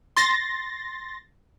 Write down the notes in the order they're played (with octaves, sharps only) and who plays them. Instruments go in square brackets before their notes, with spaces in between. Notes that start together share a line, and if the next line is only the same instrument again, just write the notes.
[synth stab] C6 A6 A#6